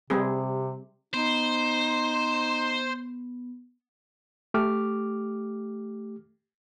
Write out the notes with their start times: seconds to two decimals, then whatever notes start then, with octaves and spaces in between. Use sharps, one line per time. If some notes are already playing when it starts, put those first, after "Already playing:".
0.10 C3 G3 C4 G#4
1.14 B3 D#4 C5
4.54 A3 G4 D6 F6